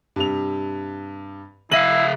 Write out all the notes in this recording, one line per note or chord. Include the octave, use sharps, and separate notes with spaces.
G2 C3 F7
C#3 E4 E5 F5 A#6 D#7 F#7